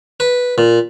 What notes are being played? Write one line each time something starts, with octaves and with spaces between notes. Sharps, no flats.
B4
A#2